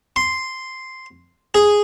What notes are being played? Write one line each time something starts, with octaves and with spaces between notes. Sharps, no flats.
C6
G#4